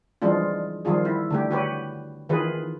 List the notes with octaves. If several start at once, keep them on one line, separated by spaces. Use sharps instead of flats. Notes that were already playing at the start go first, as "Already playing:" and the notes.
E3 F3 G3 G#3 D4 F4
D#3 F3 G3 F4 G#4
E4
D3 A3 G4
F#4 G4 B4 C#5
D#3 E3 F4 G#4 B4